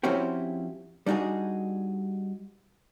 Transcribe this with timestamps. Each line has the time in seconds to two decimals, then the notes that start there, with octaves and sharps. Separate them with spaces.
0.03 F3 C4 C#4 E4 F#4 G4
1.06 G3 D4 D#4 F#4 G#4